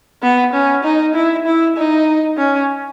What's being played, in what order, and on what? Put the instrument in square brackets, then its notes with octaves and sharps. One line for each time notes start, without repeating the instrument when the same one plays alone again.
[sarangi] B3
C#4
D#4
E4
E4
D#4
C#4